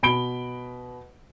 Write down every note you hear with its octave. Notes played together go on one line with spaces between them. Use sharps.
B2 B5 D7 G7